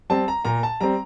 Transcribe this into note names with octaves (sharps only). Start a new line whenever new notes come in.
G3 C4 A5
A#5
A#2 A#5
A5
G3 C4 A#5